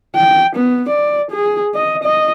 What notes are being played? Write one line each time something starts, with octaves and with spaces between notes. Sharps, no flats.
G5
B3
D5
G#4
D#5
D#5